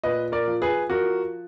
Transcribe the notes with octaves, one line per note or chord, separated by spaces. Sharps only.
A#2 B4 D#5
A#4 D5
F3
G#4 B4
F3 F#4 A#4